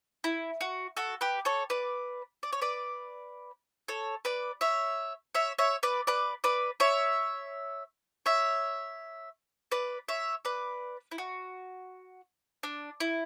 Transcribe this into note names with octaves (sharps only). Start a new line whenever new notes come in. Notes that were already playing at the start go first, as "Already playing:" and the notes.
E4
F#4
F#4 A4
G4 B4
A4 C#5
B4 D5
D5
C#5
B4 D5
A4 C#5
B4 D5
C#5 E5
C#5 E5
C#5 E5
B4 D5
B4 D5
B4 D5
C#5 E5
C#5 E5
B4 D5
C#5 E5
B4 D5
E4
F#4
D4
E4